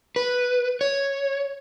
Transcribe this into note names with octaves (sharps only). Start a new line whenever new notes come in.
B4
C#5